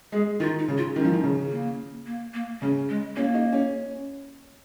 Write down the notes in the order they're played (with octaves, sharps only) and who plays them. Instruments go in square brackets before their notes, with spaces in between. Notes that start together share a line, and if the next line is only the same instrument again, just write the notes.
[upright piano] G#3 [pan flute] G#4
[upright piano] D#3 [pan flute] F4
[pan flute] D#4
[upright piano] C#3
[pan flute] F4
[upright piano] D#3 [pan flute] C#4
[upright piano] F3
D#3
C#3
[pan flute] A#3
A#3
A#3
[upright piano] C#3 [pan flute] C#4
[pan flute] G#3
[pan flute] A#3 [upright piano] C#4
[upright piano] D#4
C#4